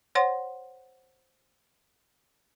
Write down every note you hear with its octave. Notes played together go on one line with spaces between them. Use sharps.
C5 C#5 F#5 C6